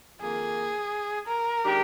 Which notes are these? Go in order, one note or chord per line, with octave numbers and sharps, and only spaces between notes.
F2 D#3 A#3 G#4
A#4
D#3 G#3 D4 G4